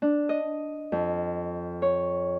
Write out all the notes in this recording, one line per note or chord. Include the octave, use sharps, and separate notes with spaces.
D4
D#5
F2
C#5